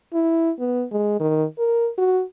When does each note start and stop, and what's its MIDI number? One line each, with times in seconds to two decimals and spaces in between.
0.14 0.51 64
0.59 0.84 59
0.92 1.16 56
1.20 1.44 51
1.58 1.89 70
1.98 2.23 66